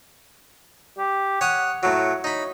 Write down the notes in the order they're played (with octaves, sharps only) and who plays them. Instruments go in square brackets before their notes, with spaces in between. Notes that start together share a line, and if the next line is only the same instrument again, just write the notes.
[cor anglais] G4
[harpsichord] C#5 D#6 [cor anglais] F#5
[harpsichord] A2 F#3 [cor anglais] F#4
[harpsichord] D#4 B5 [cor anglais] C#5